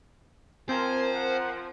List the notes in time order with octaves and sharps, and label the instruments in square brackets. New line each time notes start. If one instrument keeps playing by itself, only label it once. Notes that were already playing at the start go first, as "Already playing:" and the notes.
[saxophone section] F3 [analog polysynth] C4 A#4 [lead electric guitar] C5 [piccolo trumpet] G#5
[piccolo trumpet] F#5